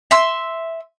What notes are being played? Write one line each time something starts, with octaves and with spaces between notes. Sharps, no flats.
E5 C6 E6